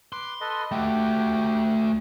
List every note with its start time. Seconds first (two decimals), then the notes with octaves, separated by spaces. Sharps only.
0.13 B4 C6 D6
0.41 A4 B4 D#5
0.72 A3 F#4 G4 G5